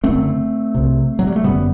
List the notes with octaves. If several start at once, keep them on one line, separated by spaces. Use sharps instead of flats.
F#1 F#2 D3 A3 C4
C2 C3
F#3
G3
A3
G1 F#2 D3 G3 B3